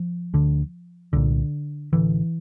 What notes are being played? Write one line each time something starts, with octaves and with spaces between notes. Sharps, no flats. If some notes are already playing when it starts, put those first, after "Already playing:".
Already playing: F3
D2 D3
C2 A#2 D3
A1 G2 D3 E3